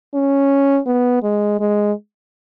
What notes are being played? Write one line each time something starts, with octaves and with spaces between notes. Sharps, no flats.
C#4
B3
G#3
G#3